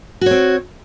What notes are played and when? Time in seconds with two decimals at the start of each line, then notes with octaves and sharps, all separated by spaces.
0.21 F#4
0.26 C#5
0.31 C4